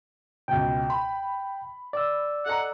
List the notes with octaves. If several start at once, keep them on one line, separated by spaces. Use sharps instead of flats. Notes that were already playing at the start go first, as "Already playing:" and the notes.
C#2 B2 G5
B5
D5 E6
A4 D#5 F#5 A#5